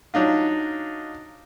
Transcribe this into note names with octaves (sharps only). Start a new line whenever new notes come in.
F#3 D4 D#4 F4